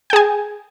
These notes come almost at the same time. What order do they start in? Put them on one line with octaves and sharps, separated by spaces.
G5 G#4 G#5